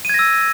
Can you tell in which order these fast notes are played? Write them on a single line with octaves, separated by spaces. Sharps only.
D#7 G#6 A#6 E6